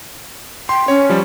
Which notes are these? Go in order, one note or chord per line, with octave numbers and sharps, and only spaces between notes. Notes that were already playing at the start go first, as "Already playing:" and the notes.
G5 C6
C#4 C#5
F3 G3